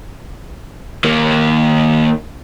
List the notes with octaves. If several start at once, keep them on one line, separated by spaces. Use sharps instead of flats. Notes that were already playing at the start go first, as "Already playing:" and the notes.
D#3 A#3